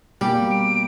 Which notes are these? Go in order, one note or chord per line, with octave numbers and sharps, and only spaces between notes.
B2 G3 A#3 G4
D7